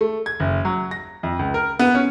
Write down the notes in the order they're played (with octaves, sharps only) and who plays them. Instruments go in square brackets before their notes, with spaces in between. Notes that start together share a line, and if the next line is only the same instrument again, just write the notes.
[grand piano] A3
G#6
F#1
F#3
A#6
F2
C#2
A#4
B3
C#4